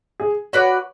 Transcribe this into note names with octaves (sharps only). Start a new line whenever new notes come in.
G#4
F#4 B4 C#5 D5